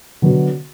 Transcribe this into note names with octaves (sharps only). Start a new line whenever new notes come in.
D3 F#3 B3 F#4